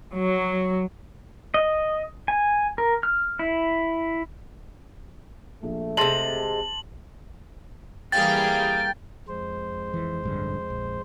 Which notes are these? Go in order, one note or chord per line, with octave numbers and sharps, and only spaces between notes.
F#3
D#5
G#5
A#4
F6
E4
A#1 A3
C3 G#3 A5 C6 A6 F#7
E3 G3 A#3 G#4 F5 G5 A6
F2 G#3 C5
E3
A1 G2 D3
A#1